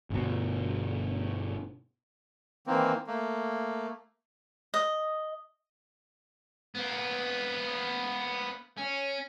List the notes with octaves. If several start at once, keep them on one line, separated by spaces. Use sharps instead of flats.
G1 B2
D#3 E3 A#3 C4
A3 A#3
D#5
A#3 B3
C#4